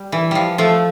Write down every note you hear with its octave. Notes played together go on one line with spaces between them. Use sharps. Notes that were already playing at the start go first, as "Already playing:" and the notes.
Already playing: G3
E3
F3 G3
F3 A3